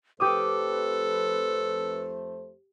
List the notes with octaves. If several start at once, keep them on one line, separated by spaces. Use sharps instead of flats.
F2 A3 G4 A4 B4 C5 D6 D#6